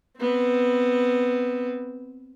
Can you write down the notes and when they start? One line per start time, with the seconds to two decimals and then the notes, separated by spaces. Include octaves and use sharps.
0.17 B3 C4